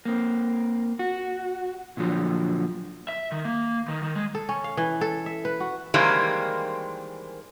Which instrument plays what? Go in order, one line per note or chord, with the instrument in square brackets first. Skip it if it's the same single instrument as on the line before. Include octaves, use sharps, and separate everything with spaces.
[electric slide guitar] A#3 C4
F#4
A#2 D3 F3 F#3
[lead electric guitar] E5
D#3
A#3
D#3
D#3
G#3
[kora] A4
C#4
F5
E3
A4
E5
B4
F#4
[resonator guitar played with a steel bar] D#3 E3 G3 G#3 A#3 C4